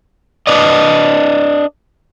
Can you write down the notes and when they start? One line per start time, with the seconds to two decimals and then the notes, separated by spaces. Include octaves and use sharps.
0.47 D4 B4 D5 D#5